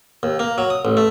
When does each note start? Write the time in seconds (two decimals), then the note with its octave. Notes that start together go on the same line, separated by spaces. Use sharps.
0.23 D#2
0.39 A#3
0.58 F#3
0.70 D#6
0.85 A1
0.97 A3